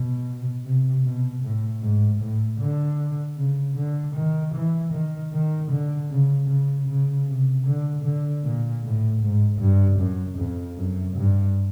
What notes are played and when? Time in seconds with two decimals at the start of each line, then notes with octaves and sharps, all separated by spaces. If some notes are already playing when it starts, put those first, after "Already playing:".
Already playing: B2
0.65 C3
1.05 B2
1.43 A2
1.82 G#2
2.21 A2
2.60 D3
3.38 C#3
3.77 D3
4.15 D#3
4.54 E3
4.93 D#3
5.33 D#3
5.71 D3
6.11 C#3
6.49 C#3
6.88 C#3
7.28 C3
7.66 D3
8.05 D3
8.44 A#2
8.84 A2
9.23 G#2
9.60 G2
9.99 F#2
10.38 F2
10.78 F#2
11.17 G2